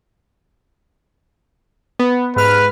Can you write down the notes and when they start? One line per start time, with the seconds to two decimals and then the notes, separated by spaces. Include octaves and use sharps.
1.99 B3
2.36 G#2 B4 F6